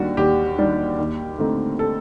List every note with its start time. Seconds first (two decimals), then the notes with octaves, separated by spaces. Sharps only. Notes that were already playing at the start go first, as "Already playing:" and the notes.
Already playing: D#2 D#3 G3 D4 F#4
0.17 D#2 G4
0.58 D#3 G3 D4
0.98 D#2
1.39 D3 A3 C4 D#4
1.79 A4